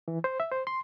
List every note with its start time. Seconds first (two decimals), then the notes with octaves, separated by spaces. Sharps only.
0.08 E3
0.24 C5
0.40 E5
0.52 C5
0.67 C6